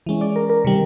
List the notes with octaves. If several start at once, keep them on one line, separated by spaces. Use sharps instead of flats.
E3 G#3 C#4
D5
A#4
A#4
C3 D#3 G3